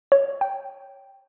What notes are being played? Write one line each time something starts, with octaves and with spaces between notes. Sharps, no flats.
C#5
G5